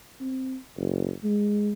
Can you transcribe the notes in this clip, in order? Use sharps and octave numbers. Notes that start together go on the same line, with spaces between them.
C4
F#1
G#3